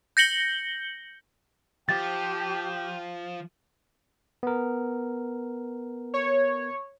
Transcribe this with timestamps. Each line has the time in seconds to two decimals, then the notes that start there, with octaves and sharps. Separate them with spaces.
0.17 G6 A#6 C#7 F#7 G7
1.89 F3 G4 G5 A6
4.43 B3 A#4
6.14 C#5